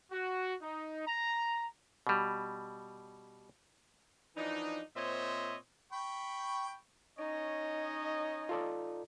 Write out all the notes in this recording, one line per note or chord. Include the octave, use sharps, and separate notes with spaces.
F#4
D#4
A#5
B2 G3
E3 F3 D4 D#4
A#2 C4 C5 C#5 D#5 E5
G5 B5 C#6
C#4 D#4 C#5 D#5
F4 A4 D5